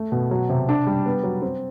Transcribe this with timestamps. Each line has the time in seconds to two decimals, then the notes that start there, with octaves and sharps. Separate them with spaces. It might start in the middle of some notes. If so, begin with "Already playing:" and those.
Already playing: A3
0.12 B2
0.31 F#3
0.50 C3
0.69 D4
0.87 G3
1.06 B3
1.24 F#3
1.42 C4